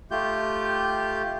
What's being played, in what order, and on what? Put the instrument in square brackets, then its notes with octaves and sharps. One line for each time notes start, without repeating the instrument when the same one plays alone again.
[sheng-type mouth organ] A3 F4 G4 G6